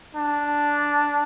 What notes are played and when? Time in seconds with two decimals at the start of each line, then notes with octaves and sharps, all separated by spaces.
0.15 D4